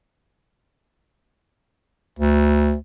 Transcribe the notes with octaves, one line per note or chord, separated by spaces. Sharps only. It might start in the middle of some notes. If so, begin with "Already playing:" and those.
D2